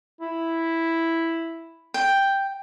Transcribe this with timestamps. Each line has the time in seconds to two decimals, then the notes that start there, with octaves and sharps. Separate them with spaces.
0.21 E4
1.94 G5